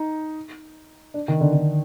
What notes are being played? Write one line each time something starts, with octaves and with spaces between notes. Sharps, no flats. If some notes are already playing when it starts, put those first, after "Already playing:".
Already playing: D#4
D4
D#3
D3
D3